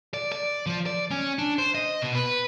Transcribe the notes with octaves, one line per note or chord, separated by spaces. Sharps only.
D5
D5
F3
D5
C#4
D4
C5
D#5
B2
B4